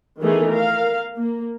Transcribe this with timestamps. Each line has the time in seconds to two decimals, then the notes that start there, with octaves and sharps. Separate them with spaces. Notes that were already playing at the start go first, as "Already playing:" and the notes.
0.20 D#3 E3 A3 B3 D#4 G#4
0.50 A#4 F5
1.17 A#3